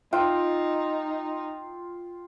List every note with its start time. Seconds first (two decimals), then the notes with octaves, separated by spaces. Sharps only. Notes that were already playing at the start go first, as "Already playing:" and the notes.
0.13 D#4 F4 G5 E6